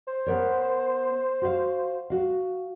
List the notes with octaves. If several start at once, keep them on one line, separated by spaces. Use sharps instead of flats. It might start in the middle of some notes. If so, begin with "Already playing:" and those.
C5
B3 A#4 C#5
F#4 F5
F#4 F5